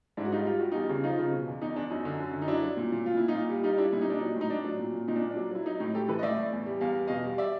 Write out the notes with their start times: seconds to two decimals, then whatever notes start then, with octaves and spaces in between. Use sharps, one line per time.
0.17 G#2 D4 E4
0.25 F#4
0.32 G3 D#4 F4
0.46 G3 F4
0.59 G3 F#4
0.72 E2 D#4 F4
0.89 C#3
1.04 F3 D#4 F4
1.19 C#3
1.33 B2
1.47 E2
1.61 E2 D#4
1.76 E2 D4
1.90 F#2 D#4
2.05 D3
2.19 F#2
2.33 D3
2.42 D#4
2.48 F#3 D4 E4
2.63 F#3
2.77 A#2
2.92 A#2
3.06 A#2 F4
3.17 A#2 E4
3.28 D#4 F4
3.34 A#2
3.49 G3
3.64 G3 D#4 F4
3.78 G3 D4 E4
3.92 A#2 E4
4.01 D#4
4.06 A#2 D4
4.18 F#3 D#4
4.36 A2
4.41 D#4
4.50 A2 D4
4.65 F#3
4.79 A#2
4.94 A#2
5.08 A#2 D#4
5.16 D4
5.22 A#2
5.31 D4
5.36 F#3
5.51 F#3 E4
5.66 F#3 D#4
5.80 A2 D#4
5.94 A2 G4 A4
6.08 E3 A4 B4
6.19 D#5
6.23 A2 D5 E5
6.38 A2
6.52 E2
6.66 G3
6.81 E2 F5
6.95 E2
7.07 B2 D#5 F5
7.24 G3
7.38 D5 E5